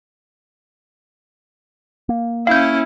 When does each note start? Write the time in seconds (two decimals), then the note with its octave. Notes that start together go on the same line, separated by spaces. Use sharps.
2.09 A#3
2.47 C#4 E4 F5 G6